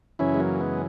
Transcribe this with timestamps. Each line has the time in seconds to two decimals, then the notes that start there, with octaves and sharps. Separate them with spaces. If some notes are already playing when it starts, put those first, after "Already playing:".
0.19 F#2 C#3 E3 C#4 E4
0.34 G#3
0.39 F#3 A#3
0.60 G#3 B3